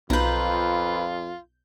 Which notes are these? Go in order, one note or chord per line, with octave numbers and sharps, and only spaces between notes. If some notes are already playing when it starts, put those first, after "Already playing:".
B1 F2 F4 B4 A#5 G6